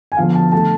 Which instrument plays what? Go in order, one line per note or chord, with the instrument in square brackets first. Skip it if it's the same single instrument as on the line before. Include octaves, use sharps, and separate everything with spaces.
[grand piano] G#5
D3 F3 B3 F5
A5
D3 A3 A5